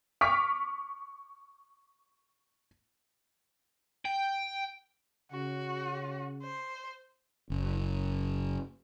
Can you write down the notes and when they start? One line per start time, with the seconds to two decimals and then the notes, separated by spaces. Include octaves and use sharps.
0.21 C#6 D6 F6 B6 D7
4.05 G5
5.32 C#3 F#4
6.43 C5
7.50 F#1